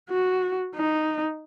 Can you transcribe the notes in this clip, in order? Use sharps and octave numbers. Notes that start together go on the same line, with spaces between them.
F#4
D#4